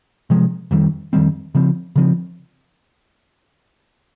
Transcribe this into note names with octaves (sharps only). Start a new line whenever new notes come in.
C3 F3 G#3
F2 D#3 G3 C4
F2 D#3 G3 C4
C#3 F3 C4
C#3 F3 C4